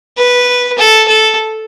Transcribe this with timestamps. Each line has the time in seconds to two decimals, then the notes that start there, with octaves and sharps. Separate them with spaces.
0.18 B4
0.78 A4
1.08 A4